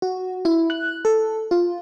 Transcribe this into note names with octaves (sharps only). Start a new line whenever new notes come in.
F#4
E4
F#6
A4
F4